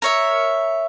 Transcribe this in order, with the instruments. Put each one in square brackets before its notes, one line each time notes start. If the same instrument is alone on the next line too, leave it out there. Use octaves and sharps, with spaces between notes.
[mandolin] A#4 C#5 E5